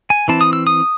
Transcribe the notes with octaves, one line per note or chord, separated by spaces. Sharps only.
G#5
E3 C4 E4 A5
D#6
E6
D#6